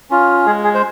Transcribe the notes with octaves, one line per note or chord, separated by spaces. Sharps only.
C#4 F4
G#3 G#4
G#4
C5